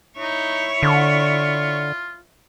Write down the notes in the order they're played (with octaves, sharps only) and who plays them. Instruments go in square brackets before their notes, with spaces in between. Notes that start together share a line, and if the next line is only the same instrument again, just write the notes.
[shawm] D#4 [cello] E4 C#5
[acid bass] D3 [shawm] F4